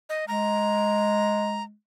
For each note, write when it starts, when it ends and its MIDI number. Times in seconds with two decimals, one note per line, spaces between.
0.09 0.25 75
0.28 1.73 56
0.28 1.63 82